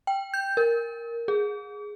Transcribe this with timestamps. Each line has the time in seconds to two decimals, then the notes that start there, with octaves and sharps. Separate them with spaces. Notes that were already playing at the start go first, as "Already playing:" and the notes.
0.07 G5
0.34 G6
0.57 A#4
1.28 G#4